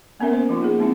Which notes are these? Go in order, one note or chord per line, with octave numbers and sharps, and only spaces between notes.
A#3 B3 C#4 A#4 E5
C5
F3 D#4 F4
A#3 G#4
G#3 C4 D#4 E4